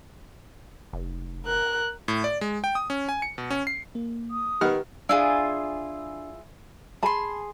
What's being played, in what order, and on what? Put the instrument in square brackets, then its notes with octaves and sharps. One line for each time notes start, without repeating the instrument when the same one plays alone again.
[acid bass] F1
[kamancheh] A#4 F#6
[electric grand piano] A2
D5
G#3
G5
D#6
C#4
G#5
C#7
B2
C#4
C7
[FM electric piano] A#3
[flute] D#6
[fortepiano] D#3 F#5 F6 [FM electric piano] G4 B4
[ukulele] D4 [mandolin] E4 F4 G#4
[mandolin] G#4 C6 [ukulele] A5 B5